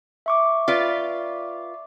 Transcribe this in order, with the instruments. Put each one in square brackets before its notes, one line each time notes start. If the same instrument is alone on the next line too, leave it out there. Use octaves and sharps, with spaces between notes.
[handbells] E5 C#6 D6
[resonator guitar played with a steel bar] F4 B4 D5